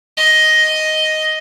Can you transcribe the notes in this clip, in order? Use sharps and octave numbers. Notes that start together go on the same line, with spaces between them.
D#5